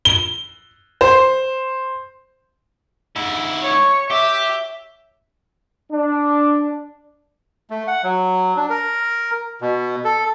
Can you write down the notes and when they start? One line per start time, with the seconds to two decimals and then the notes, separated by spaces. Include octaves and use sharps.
0.05 G7
1.01 C5
3.16 G#2 E4
3.62 C#5
4.11 G4 E5
5.92 D4
7.70 A3
7.87 F#5
8.04 F#3
8.57 D4
8.70 A#4
9.61 B2
10.05 A4